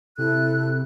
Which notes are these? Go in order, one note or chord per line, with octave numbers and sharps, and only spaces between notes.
C3 E4 A4 F#6